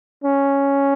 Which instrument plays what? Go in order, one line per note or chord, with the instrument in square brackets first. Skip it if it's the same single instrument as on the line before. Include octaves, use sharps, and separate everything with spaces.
[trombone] C#4